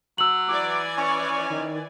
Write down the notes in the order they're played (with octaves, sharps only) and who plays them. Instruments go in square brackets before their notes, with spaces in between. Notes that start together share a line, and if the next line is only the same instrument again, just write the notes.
[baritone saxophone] F#3 [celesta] E6 F#7
[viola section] E3 D5 G#5 [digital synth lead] D6
[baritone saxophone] C#4 [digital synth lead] C#6
[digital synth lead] D#3